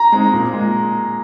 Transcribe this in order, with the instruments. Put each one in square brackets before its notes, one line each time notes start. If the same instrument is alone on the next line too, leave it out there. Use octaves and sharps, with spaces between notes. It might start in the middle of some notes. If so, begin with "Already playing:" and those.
Already playing: [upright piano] A#5
[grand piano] G#3 C4 D#4
A#2
G#3